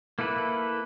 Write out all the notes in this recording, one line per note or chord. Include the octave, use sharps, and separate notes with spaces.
A#3 E4 A4 B4